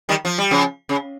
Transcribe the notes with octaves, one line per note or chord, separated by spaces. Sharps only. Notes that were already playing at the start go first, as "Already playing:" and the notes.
D#3 G3
F3
G3
C#3 F3
C#3